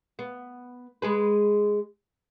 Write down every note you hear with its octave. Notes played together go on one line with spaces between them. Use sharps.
B3
G#3 G#4 B4